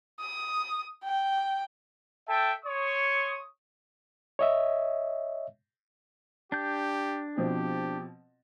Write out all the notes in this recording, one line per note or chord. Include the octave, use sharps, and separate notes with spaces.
D#6
G5
A4 E5 G5 A5
C#5 C6 C#6 D#6
C#5 D#5 E5
D4 G4 G6
B2 F3 C4 G4